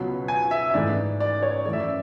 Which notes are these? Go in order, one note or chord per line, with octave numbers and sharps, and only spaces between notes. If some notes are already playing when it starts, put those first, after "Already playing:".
Already playing: C#2 B2 F#3 B3
G#5
E5
E5
G#2 E3 A3 D5
D5
C#5
F#2 E3 A3 D5
E5
D5